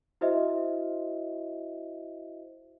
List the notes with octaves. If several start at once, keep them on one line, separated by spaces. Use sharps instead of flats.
E4 F#4 C5 D#5 E5